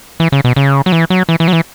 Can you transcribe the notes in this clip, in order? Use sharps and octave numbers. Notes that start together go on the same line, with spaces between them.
E3
C#3
B2
C#3
F#3
E3
F#3
E3
E3
F#3
E3